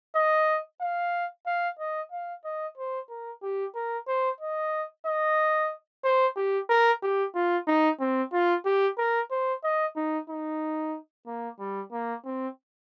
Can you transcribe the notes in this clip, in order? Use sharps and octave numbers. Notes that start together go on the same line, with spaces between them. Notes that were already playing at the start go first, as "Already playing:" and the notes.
D#5
F5
F5
D#5
F5
D#5
C5
A#4
G4
A#4
C5
D#5
D#5
C5
G4
A#4
G4
F4
D#4
C4
F4
G4
A#4
C5
D#5
D#4
D#4
A#3
G3
A#3
C4